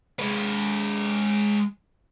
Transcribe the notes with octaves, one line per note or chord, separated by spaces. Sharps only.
G#3 B4